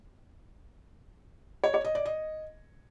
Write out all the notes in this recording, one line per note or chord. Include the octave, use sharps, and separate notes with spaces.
C#5
C#5
D#5
D5
D#5